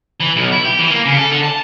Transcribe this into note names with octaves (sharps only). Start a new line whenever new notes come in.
E3
B1
E4
G4
E3
A#3
C#3
A4
D3
A5